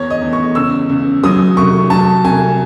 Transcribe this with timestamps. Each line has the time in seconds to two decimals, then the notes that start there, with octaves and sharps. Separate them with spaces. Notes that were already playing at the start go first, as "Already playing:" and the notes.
Already playing: E2 C#5
0.10 D#5
0.22 E2
0.33 C#6
0.55 C#2 E6
0.89 C#2
1.24 F#3 D#6
1.56 C2 C#6
1.90 F#3 A5
2.24 C2 G#5